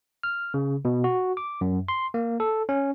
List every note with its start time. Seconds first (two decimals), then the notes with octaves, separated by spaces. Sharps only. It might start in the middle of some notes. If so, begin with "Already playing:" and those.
0.23 F6
0.54 C#3
0.85 B2
1.04 F#4
1.37 D6
1.61 F#2
1.88 C6
2.14 A#3
2.40 A4
2.69 C#4